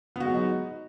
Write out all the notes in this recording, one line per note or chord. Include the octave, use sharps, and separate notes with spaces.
F#3 G#3 B3 D#4 F#4